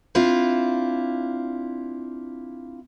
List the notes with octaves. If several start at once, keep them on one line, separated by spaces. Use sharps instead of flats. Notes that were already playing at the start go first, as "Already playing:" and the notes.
C4 D4 E4 F4